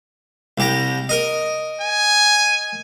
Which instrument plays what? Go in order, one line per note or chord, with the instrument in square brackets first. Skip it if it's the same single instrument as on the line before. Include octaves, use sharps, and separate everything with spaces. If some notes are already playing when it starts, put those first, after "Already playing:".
[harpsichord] C2 G4 A#5
A#4 D#5
[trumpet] G#5